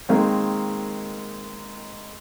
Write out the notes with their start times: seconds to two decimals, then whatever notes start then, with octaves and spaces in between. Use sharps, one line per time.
0.09 D#3 G#3 A#3 C4